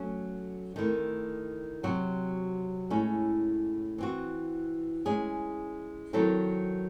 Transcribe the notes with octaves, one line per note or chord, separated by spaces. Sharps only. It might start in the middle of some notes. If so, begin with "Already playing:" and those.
Already playing: F#3 A3 C#4
D#3 A3 C4 E4
C3 F#3 C4 F#4
A2 G#3 C#4 E4
E3 C4 F#4
G#3 C#4 E4 G#4
D#3 F#3 C4 E4 A4